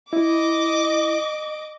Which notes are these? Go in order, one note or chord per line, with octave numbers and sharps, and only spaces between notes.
E4 D#5 D6